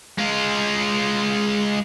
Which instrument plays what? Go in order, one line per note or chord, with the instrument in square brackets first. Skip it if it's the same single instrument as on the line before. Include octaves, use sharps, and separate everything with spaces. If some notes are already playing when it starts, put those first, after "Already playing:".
[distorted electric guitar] G#3 F4